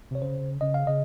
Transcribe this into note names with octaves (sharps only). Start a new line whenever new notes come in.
C3 C#5
C#3 C5
C#3 D#5
F5
C#3 D#5